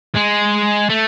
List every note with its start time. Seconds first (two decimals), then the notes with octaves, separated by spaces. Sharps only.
0.15 G#3
0.89 A3